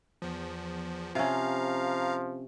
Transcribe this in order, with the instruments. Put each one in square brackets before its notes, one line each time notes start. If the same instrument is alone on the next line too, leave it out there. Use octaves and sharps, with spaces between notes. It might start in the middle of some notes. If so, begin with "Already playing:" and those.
[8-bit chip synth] E2 F3
[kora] C3 C#4 [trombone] F3 [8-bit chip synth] F5 A#5